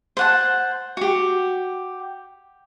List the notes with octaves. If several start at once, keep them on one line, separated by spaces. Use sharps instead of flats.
C5 F#5 A5
F#4 G4